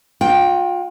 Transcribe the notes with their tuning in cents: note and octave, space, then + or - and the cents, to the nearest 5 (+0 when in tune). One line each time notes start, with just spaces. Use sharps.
F4 +35 G5 +0